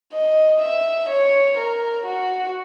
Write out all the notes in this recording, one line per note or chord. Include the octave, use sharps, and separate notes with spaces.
D#5
E5
C#5
A#4
F#4